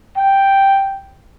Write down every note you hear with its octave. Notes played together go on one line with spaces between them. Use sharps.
G5